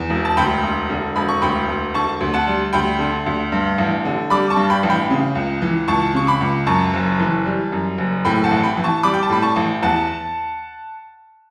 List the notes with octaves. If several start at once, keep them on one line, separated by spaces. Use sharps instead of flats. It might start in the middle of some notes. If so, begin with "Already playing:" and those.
Already playing: E2
E1
A5
D2 G5 B5
E1
D3
E1 B5
C#6
D2 G5 B5
E1
D3 A5 C#6
D2
F#5 A5
G3
D2 G5 B5
D3
D2
G2
A1
D3
G3 B5 D6
A5 C#6
G2
G5 B5
A1
G5 B5
C#3
C#2
E3
C#2 A5 C#6
C#3 C#6
B5 D6
C#2
F#2 A5 C#6
F#1
E3
G3
F#2
F#1
A2 G5 B5
F#5 A5
A1
G5 B5
E3
A5 C#6
G3 B5 D6
G5
A5
A2 B5
A5 C#6
A1
E2 F#5 A5